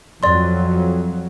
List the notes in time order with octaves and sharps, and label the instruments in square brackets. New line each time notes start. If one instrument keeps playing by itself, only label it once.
[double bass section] F2 F#3 [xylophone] D5 C6